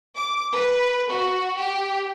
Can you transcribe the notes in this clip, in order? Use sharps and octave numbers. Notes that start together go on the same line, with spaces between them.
D6
B4
F#4
G4